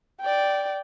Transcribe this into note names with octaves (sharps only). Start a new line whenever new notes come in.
D5 G5